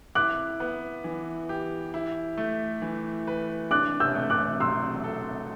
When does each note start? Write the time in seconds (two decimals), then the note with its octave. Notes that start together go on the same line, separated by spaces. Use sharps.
0.15 E4 D6 F#6
0.60 B3
1.04 E3
1.49 G4
1.94 E4
2.38 A3
2.82 E3
3.27 B4
3.71 D4 D6 F#6
4.00 E6 G6
4.15 A3
4.30 D6 F#6
4.60 F#3 C6 E6
5.04 A4